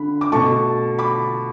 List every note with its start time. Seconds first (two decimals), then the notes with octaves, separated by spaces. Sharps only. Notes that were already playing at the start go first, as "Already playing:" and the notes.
Already playing: D3 B5
0.21 D6
0.32 B2 A3 A5 C#6
0.99 B5 D6